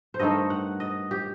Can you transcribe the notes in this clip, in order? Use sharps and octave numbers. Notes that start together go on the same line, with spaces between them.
C5
G2 D#3 A3 D#5
F#5
D#5
G4